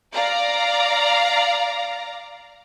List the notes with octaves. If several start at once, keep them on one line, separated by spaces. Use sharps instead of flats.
D5 F5 A#5